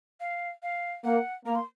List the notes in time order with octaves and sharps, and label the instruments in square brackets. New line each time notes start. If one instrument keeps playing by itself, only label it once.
[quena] F5
F5
[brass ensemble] A#3 [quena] F#5
[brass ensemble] A#3 [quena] A#5
[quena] C6